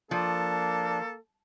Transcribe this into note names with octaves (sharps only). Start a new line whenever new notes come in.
F3 A#3 D4 A4